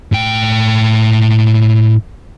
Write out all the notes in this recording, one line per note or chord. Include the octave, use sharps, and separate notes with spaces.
A2 G5